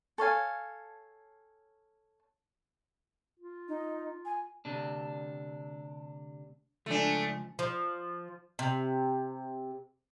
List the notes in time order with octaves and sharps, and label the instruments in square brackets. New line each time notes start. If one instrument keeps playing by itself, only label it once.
[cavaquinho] A4 C#5 F5 G#5
[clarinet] F4
[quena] D#4
G#5
[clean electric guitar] D2 C3 D4
[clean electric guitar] C#2 F3 G#5 [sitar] A3 D4
[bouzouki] F3
C3